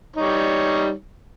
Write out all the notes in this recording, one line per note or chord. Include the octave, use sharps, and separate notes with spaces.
G3 D#4 C#5